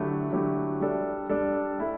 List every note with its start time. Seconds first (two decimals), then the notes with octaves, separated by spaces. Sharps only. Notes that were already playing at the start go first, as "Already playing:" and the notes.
Already playing: D3 F#3 A3 E4 G4
0.32 D3 F#3 A3 E4 G4
0.80 G3 D4 A4 D5
1.29 G3 D4 A4 D5
1.78 A3 E4 A4